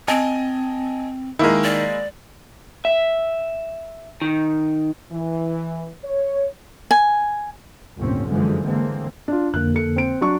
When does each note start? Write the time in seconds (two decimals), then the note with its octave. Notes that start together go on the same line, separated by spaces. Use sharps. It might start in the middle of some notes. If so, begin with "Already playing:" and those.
0.08 C4 D#5 G#5 A5
1.39 D#3 G#3 A#3 E4 A#4
1.64 D5
2.85 E5
4.22 D#3
5.12 E3
6.04 C#5
6.91 G#5
7.99 G1 D#2 A2 C3 C4 C#4
8.28 F#2 D3 E3 F3 G#3
8.65 D3 E3 G#3 A#3 C4
9.28 D4 F4
9.54 F2 D3 A#3 F#6
9.74 A4 C#7
9.96 C4 D7
10.21 F#3 D4 C#6